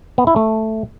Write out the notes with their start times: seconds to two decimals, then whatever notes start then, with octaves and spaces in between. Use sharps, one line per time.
0.18 B3
0.27 E4
0.36 A3